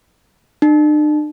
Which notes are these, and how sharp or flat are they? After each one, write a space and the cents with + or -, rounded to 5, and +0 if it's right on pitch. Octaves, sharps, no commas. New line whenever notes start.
D4 +45